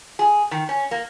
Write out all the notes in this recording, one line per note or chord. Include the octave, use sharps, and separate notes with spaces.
G#4
D#3
C#4
A#3